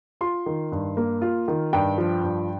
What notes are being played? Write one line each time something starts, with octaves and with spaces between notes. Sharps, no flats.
F4 C6
D#3
G2
A#3
F4
D#3
G2 G5
F3
G2